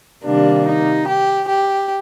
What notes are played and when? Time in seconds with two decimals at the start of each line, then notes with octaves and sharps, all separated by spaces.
0.23 C3 D#3 G3 A#3 D4
0.65 D#4
1.07 G4
1.47 G4